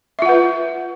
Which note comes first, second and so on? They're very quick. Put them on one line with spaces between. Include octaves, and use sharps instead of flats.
E5 F4 F#5 B4